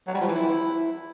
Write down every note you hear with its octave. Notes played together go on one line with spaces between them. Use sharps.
F#3
G3
F3
E3
E4